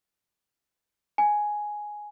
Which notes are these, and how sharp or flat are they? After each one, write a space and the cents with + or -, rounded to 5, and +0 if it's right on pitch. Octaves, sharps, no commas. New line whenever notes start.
G#5 +5